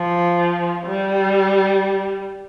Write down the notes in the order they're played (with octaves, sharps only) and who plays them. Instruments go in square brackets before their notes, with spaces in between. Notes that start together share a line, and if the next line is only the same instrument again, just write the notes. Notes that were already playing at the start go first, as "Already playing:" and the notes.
Already playing: [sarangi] F3
G3